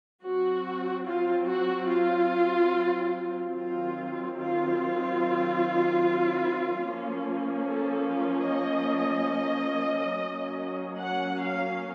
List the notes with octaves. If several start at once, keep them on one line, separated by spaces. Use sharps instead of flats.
F#3 C4 F#4
F4
F#4
F4
D#3 F#3 C4 F4
F4
F3 A#3 C#4
A4
F4
D#5
F#3 A#3 C#4
F#5
F5